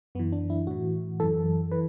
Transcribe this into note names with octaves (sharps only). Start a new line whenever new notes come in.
F#2 E3 B3
D4
E4
A2 E3 F#4
F#2 E3 A4
E3 B4